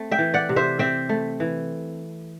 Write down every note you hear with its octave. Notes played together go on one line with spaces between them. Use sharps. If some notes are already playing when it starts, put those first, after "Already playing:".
Already playing: A3 C4
E5 G5
E3
D5 F#5
C3
C5 E5
C4 E5 G5
A3
E3